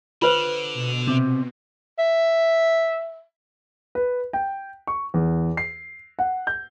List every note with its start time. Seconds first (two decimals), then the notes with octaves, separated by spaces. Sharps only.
0.22 D3 F4 B4 C5
0.74 B2
1.08 C3
1.99 E5
3.95 B4
4.33 G5
4.87 C#6
5.14 E2
5.57 C7
6.19 F#5
6.47 G6